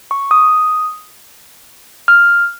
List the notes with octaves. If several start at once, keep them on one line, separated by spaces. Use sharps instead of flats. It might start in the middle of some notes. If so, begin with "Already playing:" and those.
C#6
D#6
F6